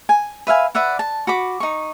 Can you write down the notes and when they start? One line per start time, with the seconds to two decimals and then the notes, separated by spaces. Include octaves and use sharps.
0.09 G#5
0.47 B4 E5 F5 G#5
0.75 B4 D5 E5 F#5
0.99 A5
1.27 F#4 B5 D6
1.60 D#4 C#6